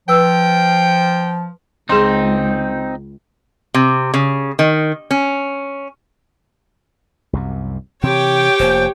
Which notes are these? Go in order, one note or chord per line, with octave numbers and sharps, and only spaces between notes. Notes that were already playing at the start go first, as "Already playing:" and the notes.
F3 B4 G5 E6
C#2 C4 D#4 G#4 C6
C3
C#3
D#3
C#4
C2 F#2 C3
C3 E3 C4 G4 C#5 G5
F1 F3 A#3 C5